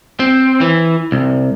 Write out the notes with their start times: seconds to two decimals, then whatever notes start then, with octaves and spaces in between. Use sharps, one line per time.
0.20 C4
0.61 E3
1.12 C2